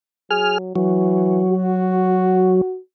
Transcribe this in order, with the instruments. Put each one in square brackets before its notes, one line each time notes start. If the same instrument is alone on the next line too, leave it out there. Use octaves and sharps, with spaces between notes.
[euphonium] F#3 [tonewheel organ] G#4 F6
[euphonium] E3 [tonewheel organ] F#3
[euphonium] F#4